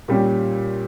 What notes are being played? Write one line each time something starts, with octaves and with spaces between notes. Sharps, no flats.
A#2 G3 C#4 G4